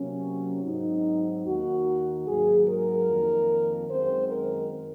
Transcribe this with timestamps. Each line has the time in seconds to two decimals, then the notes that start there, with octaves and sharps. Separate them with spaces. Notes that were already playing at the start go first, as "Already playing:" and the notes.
Already playing: C3 F#3 A#3 C#4
0.63 G#2 F#3 C4 D#4
1.45 D#2 D#3 A#3 F#4
2.26 G#2 F#3 A#3 G#4
2.66 A#4
3.07 F2 D#3 A#3
3.89 F#2 D#3 G#3 C4 C5
4.29 A#4